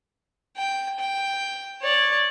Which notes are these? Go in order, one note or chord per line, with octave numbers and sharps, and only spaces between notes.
G5
G5
C#5 D5